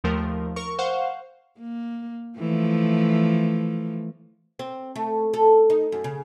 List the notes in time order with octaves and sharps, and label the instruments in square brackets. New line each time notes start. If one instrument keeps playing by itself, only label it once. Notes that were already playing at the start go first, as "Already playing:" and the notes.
[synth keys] D#2 F3 A3 A#4
A#4 C#6
C5 F5 F#5 C#6
[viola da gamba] A#3
E3 F3 A3
[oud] C4
A3
A4
D#4
F#2
C#3